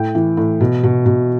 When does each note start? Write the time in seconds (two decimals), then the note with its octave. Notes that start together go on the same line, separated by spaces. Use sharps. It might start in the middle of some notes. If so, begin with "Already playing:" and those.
Already playing: A2 G5
0.15 E3
0.37 A2
0.61 B2
0.83 B2
1.06 B2